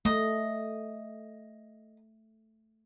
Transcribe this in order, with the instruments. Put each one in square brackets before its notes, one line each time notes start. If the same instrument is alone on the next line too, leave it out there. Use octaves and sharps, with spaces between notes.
[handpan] A3 [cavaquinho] D#5